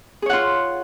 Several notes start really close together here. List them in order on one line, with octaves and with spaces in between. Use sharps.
G#4 C#5 F#5 F4